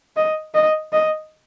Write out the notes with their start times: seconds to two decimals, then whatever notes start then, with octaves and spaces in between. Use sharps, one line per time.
0.16 D#5
0.55 D#5
0.93 D#5